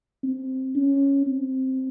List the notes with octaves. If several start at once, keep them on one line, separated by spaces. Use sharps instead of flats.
C4
C#4
C4